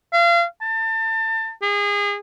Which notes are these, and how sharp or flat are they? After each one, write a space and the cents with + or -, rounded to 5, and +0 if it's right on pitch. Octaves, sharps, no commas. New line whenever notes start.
F5 -30
A5 +30
G#4 -30